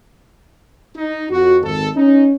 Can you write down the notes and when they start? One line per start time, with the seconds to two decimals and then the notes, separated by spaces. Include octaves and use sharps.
0.96 D#4
1.30 F2 F#4
1.63 G#1 A4
1.95 C#4 D#4